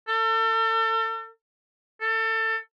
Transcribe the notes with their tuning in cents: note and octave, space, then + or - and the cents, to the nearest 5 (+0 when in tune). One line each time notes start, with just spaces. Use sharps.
A4 +35
A4 +25